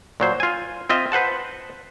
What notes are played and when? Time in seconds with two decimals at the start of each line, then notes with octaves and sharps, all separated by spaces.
0.20 A#2 F#3 C5
0.40 F4 G#5
0.89 C4 F4 D#5 E5
1.12 B4 C5 F#5 A5